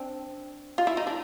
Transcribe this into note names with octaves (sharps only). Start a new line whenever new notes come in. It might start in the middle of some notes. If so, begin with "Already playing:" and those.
Already playing: C4 D4
F4
E4
D#4
D4